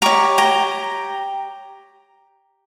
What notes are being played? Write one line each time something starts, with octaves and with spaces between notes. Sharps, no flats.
G4 C#5 A#5 C#6
G5 A#5